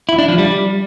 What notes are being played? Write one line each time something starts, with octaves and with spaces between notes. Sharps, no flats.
E4
D4
F3
G3